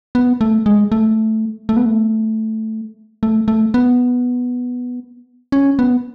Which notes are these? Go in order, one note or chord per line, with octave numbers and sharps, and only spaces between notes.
B3
A3
G#3
A3
A3
B3
A3
A3
A3
B3
C#4
B3